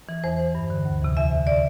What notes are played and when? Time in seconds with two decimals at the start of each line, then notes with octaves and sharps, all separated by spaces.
0.09 E3
0.24 E2 C5
0.39 E3
0.55 G2
0.70 D3
0.85 D2
1.02 C3 E3
1.17 E2 E5
1.32 D3
1.47 D5